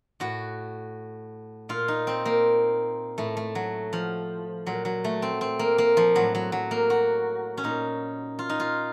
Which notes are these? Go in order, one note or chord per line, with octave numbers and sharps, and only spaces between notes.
A2 F#4
A#2 F4
D#4
C4
A#3
A2 A3
A3
F#3
F3
A#2 F#3
F#3
A3
C4
C4
A#3
A#3
F3
A2 F#3
F#3
F#3
A#3
F#4
C#4
A#2 D#4
F4
D#4
F4